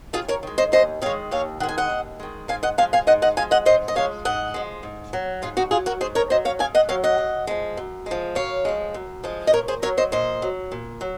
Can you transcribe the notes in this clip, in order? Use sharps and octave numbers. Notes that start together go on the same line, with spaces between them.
D#2 F4 G#4
A#4 C#5
D#3 G#3
C5 D#5
D#2 C5 D#5
D#3 G#3 C#5 F5
D#2 C#5 F5
D#3 G#3 F#5
G#5
D#5 F#5
D#2
D#3 G#3
G#2 F5 G#5
D#5 F#5
F3 G#3 F5 G#5
F5 G#5
G#2 D#5 F#5
D#5 F#5
F3 G#3 F5 G#5
D#5 F#5
G#2 C5 D#5
D#5
F3 G#3 C#5 F5
G#2 D#5 F#5
F3 G#3
G#2
F#3
G#2 F4 G#4
D#4 F#4
F#3 F4 G#4
F#4 A#4
G#2 G#4 C5
A#4 C#5
F#3 C5 D#5
C#5 F5
G#2 F5 G#5
D#5 F#5
F#3 C#5 F5
D#5 F#5
F#2
F3 G#3
F#2
F3 G#3
F#2 C#5 F5
F3 G#3
F#2
F3 G#3
D#5
A#2 A#4 C#5
G#4 C5
F#3 A#4 C#5
C5 D#5
A#2 C5 D#5
F#3
A#2
F#3